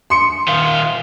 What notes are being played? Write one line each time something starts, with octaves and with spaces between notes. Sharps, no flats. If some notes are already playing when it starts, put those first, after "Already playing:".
C6 C#7
D#3 F4